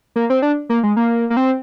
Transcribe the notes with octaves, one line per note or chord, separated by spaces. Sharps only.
A#3
C4
D4
A#3
G#3
A#3
A#3
C4